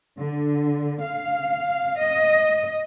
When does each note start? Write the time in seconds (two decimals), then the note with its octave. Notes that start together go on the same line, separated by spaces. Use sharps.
0.17 D3
1.02 F5
2.01 D#5